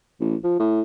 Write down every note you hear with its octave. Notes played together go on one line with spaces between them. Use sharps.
A1
F3
A2